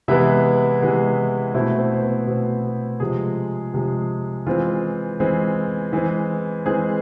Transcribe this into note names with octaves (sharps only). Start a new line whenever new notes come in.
C3 E3 G#3 B3 E4 E5
C3 E3 G#3 B3
B2 A3 C4 E4 E5
C4 C5
C5
B3 B4
B2 A3 C4
C3 F3 G#3 G#4
C3 F3 G#3
E3 G#3 C4 F4
E3 G#3 C4
E3 G#3 C4
E3 G#3 C4 G#4